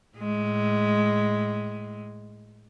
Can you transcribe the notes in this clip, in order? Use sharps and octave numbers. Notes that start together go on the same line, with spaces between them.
A2 G#3